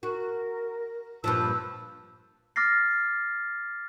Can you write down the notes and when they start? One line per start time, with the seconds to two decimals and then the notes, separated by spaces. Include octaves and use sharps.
0.03 F#4 A#4
1.24 G2 A#2 F3 E6
2.56 D6 F6 A6 A#6 C7